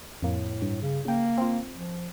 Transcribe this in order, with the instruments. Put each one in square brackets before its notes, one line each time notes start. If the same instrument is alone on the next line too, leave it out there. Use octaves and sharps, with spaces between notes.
[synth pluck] F2 A#3 [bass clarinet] A2
[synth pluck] G2
[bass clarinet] C#3
[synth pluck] C#3 G5 [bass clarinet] A#3
[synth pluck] C4 F4
[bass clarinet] F3